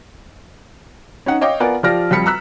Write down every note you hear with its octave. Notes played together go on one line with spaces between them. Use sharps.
C#4 D#4 F#5
C#5 D#5 F5 G5 D6
B3 F4 A#4 D5 F#5 G#5
F3 F4 G4 D5 F6 A#6
F2 G3 B5 F6 B6 C#7
A#5 E6 F#6 B6